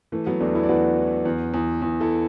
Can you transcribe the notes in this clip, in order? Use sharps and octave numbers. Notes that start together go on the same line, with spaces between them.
E3 A3
F#3 B3
E2 A3 D4
B3 E4
D5
E2 F#4 B4
E3
E2
E2
E2
E4 A4